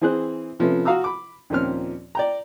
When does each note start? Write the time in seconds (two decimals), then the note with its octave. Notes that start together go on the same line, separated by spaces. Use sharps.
0.01 E3 C4 G#4 C5 F#6
0.60 C3 F3 A3 B3 C#4
0.85 F#4 F5 A#5 D#6 E6
1.04 B5 D6
1.50 D#2 A#2 F3 C4 C#4 F6
2.15 D5 G5 A#5